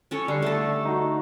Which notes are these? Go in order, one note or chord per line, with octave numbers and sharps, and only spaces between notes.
C#4 A4 C#5
D3 G3 C7
A3 A4
D#4 F#4